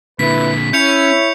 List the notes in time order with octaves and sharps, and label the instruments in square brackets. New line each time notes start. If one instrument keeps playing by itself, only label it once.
[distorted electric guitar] A#2 D3 [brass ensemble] E4 B4 [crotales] B6
[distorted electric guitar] C#4 [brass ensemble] E4 C#5 [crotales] G6 C#7 F7